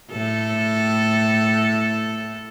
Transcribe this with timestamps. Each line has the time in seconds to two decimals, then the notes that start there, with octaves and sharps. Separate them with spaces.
0.12 A2 A4